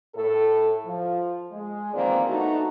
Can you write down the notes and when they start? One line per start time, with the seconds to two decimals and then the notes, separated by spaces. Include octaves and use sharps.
0.15 A2 A4
0.86 F3
1.52 G#3
1.94 E2 D#3 F3 A#3 C4 D5
2.28 A3 B3 D4 D#4 F#4